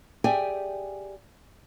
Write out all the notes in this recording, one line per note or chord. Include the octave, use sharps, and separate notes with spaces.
G4 G#4 D5 E5 G5 G#5